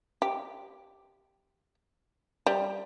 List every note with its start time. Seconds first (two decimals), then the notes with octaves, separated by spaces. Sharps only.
0.22 G4
2.46 G3